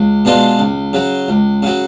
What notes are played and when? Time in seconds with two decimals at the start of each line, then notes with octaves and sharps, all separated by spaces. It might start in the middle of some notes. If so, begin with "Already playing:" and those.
Already playing: C#2
0.25 B2 G#3 D4 F4
0.59 C#2
0.93 C#3 F#3
1.28 C#2
1.63 C#3 F#3